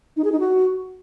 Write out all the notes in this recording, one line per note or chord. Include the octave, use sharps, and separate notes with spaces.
D#4
G#4
D#4
F#4